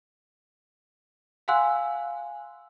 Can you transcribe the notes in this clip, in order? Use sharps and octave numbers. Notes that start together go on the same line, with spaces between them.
F5 F#5 G#5 C6 E6 F#6